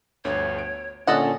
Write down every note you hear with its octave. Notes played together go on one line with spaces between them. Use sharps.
G1 D2 C#5
D7
A#2 D3 C#4 A4 D5 D#5 F#5